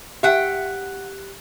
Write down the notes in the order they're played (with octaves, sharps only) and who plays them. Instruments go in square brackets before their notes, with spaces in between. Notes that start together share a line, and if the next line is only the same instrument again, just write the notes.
[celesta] G4 F#6 [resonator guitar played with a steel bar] E5 F#5 G5